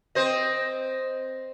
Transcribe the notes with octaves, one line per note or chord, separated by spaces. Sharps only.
C4 C5 D#5